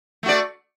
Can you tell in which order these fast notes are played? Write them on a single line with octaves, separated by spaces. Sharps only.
A3 F#4 D5